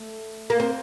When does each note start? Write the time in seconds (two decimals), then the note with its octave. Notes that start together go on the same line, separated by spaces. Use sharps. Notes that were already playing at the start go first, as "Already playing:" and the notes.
Already playing: A3
0.50 A#3
0.60 C4